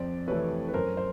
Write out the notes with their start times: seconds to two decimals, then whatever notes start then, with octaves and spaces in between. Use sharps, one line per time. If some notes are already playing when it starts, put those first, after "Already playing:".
Already playing: F2 C5 D5
0.28 C3 E3 A3 B4 C#5
0.68 B4
0.74 F#2 A#4 C5
0.97 C5